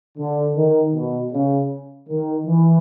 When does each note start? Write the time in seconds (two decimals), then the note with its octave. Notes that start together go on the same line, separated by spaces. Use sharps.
0.18 D3
0.56 D#3
0.95 B2
1.33 C#3
2.09 D#3
2.47 E3